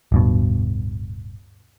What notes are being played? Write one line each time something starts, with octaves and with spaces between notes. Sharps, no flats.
D1 G2 B2